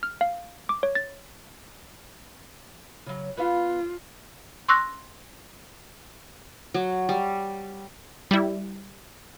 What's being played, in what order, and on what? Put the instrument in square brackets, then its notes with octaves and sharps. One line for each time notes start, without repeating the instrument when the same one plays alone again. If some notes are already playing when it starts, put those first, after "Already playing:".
[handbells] F6
F5
D6
C#5
A6
[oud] C#3 F#3
[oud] B3 B4 F5 [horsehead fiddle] F4
[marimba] C6 C#6 E6 F#6 A#6
[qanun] F#3
G3
[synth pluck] G3 E4